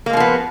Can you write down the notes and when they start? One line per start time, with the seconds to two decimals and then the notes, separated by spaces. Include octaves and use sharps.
0.06 A#3
0.10 G#3
0.13 B2
0.17 F3
0.20 B3